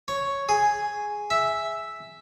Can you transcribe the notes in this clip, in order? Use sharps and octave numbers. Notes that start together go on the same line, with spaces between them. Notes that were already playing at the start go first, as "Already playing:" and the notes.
C#5
G#4
E5